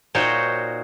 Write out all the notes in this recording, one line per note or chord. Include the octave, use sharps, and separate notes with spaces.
A#2 D#4 F#4 C5 C#5 G5